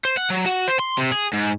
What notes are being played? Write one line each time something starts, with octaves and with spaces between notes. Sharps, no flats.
C5
F#5
F#3
F#4
C5
C6
C3
G#4
G#2